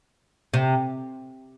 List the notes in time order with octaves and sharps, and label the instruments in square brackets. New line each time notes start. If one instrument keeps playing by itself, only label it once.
[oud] C3